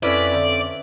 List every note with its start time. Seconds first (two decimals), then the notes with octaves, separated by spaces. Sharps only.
0.03 F2 C#4 E4 B4 D5
0.33 D3